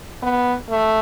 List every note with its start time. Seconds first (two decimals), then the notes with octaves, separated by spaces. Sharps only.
0.23 B3
0.70 A3